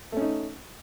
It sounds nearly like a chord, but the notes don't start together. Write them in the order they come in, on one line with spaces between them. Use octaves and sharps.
A3 C#4 D#4